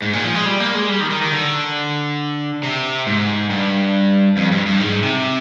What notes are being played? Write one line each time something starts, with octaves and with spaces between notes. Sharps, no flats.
G#2
A#2
F3
G#3
G3
A#3
G#3
G3
D#3
D#3
D#3
D3
C3
G#2
G2
F2
G2
G2
G#2
C3